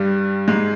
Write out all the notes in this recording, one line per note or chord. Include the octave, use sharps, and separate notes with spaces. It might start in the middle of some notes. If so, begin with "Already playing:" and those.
Already playing: G2 G3
G#2 G#3